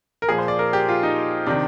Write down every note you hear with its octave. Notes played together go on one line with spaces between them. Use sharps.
A#4
A#2 F3 G#4
C5
D5
A#4
G4
F4
D#4
C3 D#3 D4